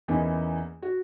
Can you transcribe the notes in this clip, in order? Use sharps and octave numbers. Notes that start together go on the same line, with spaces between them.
E2 E3 A#3 C#4 D#4
F#4